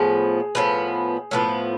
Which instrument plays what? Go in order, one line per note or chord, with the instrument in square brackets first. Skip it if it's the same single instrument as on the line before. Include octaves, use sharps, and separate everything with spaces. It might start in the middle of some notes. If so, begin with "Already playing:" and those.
Already playing: [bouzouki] A2 F3 B3 [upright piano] G#4
[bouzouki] A2 F3 B3
A2 F3 B3